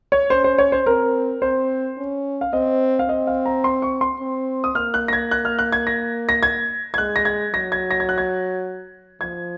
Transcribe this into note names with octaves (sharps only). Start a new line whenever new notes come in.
C#5
C#4 C5
C5
C#5
C5
C4 A#4
C4 C5
C#4
F5
C4 D#5
F5
C4 D#5
F5
A#5
C6
C#6
C6
C4
D#6
A#3 F6
F#6
A#6
G#6
F#6
F6
F#6
G#6
A#6
A#6
G#6
G#6
G#3 F#6
A#6
G#6
F#3 A#6
G#6
A#6
G#6
F#6
G#6
F3 G#6